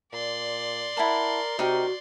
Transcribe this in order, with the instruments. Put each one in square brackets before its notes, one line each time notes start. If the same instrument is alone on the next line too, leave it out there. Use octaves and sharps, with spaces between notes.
[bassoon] A#2 [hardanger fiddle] D5 C6
[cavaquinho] E4 F#5 A5 [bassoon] A#4
[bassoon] C3 [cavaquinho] D#4 A#4 G5 [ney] F#4